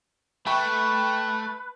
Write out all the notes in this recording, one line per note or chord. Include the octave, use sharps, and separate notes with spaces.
A3 B4 G5 B5 C#6